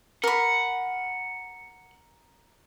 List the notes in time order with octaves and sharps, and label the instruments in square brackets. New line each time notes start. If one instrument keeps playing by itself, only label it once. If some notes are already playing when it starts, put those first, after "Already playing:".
[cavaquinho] A#4 B5 [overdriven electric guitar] F#5